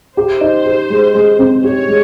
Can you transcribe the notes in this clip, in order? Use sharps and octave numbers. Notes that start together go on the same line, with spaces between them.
G4 C5
D#4
G4
G#3
G#3
C4
G4 C#5
G#3